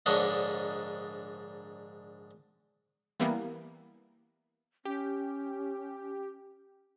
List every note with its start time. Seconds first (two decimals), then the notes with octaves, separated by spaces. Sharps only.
0.06 A#1 G#2 D3 D4 C#5 D#5
3.20 E3 G3 A#3 B3
4.85 C#4 G4